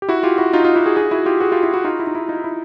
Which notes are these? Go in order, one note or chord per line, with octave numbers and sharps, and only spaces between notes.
G4
E4 F#4
F4 G4
E4 F#4
D#4 F4
D#4 F4
E4 F#4
F#4 G#4
F#4 G#4
E4 F#4
F4 G4
F#4 G#4
F4 G4
E4 F#4
E4 F#4
D#4 F4
E4
D#4
E4
D#4 F4
E4